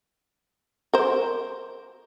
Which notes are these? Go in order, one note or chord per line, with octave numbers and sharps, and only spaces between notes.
A#4 C5